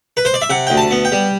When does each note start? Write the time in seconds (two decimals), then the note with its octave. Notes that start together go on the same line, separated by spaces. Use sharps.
0.17 B4
0.25 C5
0.34 D5
0.42 E5
0.50 C3 F#5
0.67 D2 G5
0.77 A5
0.91 B3
1.05 G5
1.12 G3